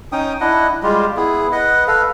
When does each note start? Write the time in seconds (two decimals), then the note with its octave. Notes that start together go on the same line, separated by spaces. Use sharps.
0.12 C#4 D#4 G5 D#6
0.41 D4 E4 D#5 F#5
0.83 G3 G#3 F4 G4
1.17 B3 E4 G#4
1.52 B4 D#5 F#5
1.88 A4 B4 F5